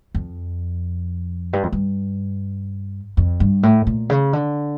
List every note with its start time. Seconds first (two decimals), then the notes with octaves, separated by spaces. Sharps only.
0.15 F2
1.53 G2
1.63 F2
1.72 G2
3.17 F2
3.40 G2
3.63 A2
3.87 A#2
4.10 C#3
4.33 D3